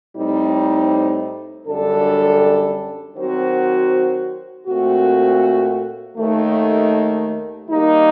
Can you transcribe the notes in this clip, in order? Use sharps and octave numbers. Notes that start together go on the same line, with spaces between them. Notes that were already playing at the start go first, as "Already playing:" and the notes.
A2 G3 C4 D#4
F#2 D3 G3 D4 A4
D#3 F#3 C4 F#4 C5
A#2 A3 C4 F#4
D#2 D#3 A3
D#3 G3 A#3 D#4 G4